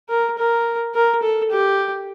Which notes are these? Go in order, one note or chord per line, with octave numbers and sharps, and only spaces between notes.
A#4
A#4
A#4
A4
G4